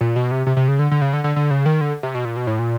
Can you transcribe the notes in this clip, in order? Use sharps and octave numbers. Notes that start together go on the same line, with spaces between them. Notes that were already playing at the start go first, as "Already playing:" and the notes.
A#2
B2
C3
C3
C3
C#3
D3
D3
C#3
D3
D3
D3
C#3
D#3
D3
C3
B2
A#2
B2
A2
A#2